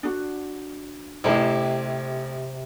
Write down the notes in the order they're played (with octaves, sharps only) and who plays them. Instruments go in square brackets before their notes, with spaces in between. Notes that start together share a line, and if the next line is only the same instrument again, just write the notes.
[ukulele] D4 F#4
[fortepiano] A1 E4 [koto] C3